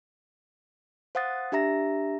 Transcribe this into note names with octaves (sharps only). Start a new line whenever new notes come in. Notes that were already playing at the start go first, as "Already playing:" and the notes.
C5 F5 F#5 D#6 A6
D4 G4 E5 A#5 A#6